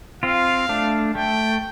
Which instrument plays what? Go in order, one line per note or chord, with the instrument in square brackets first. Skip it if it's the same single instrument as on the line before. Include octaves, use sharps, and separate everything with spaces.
[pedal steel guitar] C4 F4 [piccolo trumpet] F5
[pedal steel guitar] A3 D4
[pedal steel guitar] A3 [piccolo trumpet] G5